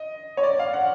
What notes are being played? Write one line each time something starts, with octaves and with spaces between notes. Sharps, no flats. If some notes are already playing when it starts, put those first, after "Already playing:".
Already playing: D#5
C#5
D5
F5
F#5